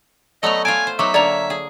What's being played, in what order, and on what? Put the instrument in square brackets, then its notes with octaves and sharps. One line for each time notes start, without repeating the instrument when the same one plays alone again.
[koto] F#3 A3 B3 [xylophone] D5 F7 [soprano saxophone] D#5
[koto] F4 F5 A5 [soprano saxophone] G#5 [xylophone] D7
[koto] C5
[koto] F#3 B3 D#4 [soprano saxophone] E5 [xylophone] C#6 D6
[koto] D3 A#3 C#5 [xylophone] D5 A#5 F7
[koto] G#4